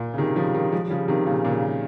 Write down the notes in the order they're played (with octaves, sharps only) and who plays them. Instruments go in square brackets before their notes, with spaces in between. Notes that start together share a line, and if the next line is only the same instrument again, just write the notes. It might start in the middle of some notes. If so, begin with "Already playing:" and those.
Already playing: [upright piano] A#2
C#3
C3 D#3
C#3 F3
F3
D#3 G3
F3 G#3
G3
C#3 F3
C3 D#3
A#2 C#3
A#2 C#3
C3